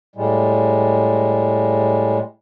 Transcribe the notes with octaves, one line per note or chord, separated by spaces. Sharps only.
A2 G3 G#3